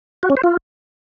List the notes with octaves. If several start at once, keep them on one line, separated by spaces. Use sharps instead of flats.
F#4
C#4
C5
F4